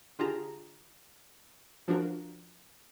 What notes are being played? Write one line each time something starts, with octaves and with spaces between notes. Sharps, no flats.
D3 F4 G4 G#4 A5 A#5
F3 D4 F#4 A#4